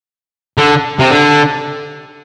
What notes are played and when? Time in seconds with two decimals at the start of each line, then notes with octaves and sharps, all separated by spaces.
0.58 D3
0.99 C3
1.10 D3